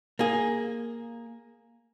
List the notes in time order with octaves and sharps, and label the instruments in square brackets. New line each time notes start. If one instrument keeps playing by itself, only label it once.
[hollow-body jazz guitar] A#3 G#4